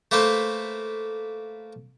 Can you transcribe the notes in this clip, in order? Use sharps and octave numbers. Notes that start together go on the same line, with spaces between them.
A3 A#3 B4 C5